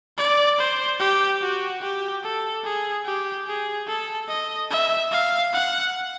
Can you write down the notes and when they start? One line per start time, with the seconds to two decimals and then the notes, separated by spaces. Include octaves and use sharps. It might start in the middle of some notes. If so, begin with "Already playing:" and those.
0.18 D5
0.59 C5
1.00 G4
1.42 F#4
1.82 G4
2.23 A4
2.65 G#4
3.05 G4
3.47 G#4
3.88 A4
4.29 D#5
4.71 E5
5.12 F5
5.53 F#5